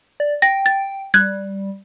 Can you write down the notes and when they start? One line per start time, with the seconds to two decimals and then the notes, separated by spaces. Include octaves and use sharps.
0.20 D5
0.42 G5 A#6
0.66 A6
1.14 G3 F#6 G#6